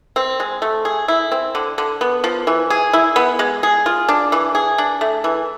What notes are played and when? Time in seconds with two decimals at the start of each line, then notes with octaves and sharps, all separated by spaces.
0.16 C4
0.40 G#3
0.62 A3
0.85 G#4
1.08 E4
1.31 C4
1.55 D3
1.78 D3
2.01 B3
2.24 F3
2.47 E3
2.70 G#4
2.93 E4
3.16 B3
3.39 G#3
3.63 G#4
3.86 F4
4.09 D4
4.32 E3
4.55 G#4
4.78 D4
5.01 A3
5.24 E3